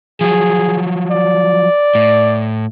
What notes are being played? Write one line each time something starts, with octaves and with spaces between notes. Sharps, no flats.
F3 F#3 G#4
D5
A2